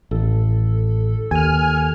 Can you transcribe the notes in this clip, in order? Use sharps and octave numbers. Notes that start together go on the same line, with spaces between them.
A1 A4
D#2 G#5 F6